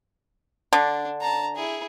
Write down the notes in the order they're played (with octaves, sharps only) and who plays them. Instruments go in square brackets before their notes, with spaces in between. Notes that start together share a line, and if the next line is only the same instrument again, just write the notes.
[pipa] D3 [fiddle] D4
[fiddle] A5 A#5
E4 G#4